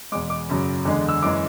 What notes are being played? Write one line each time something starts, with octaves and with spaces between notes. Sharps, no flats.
E2 B2 G#3 D6
D6
F#2 C#3 F#3
E2 D3 G#3
E6
F#2 E3 G#3 D6